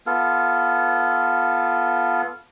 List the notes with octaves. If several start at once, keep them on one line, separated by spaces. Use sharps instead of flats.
B3 F4 A4